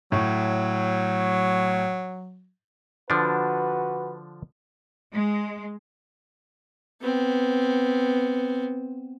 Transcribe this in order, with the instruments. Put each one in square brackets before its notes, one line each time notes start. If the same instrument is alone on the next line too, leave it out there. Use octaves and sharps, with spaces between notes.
[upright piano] A2 [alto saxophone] F#3
[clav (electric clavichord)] D3 F3 D4 [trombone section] F#4 B4
[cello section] G#3
[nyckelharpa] B3 C4